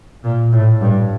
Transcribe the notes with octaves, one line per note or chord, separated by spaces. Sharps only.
A#2
A2
G2